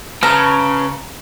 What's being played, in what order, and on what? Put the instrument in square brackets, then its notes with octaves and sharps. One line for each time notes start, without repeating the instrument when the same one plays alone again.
[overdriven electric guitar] C#3 [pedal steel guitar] B4 A5 F6 [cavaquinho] A#5